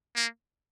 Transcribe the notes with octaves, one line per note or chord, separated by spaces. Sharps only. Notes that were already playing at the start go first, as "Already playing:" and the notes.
A#3